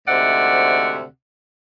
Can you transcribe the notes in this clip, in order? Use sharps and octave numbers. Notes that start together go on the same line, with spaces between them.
D2 G#2 C3 D5 E5 F#5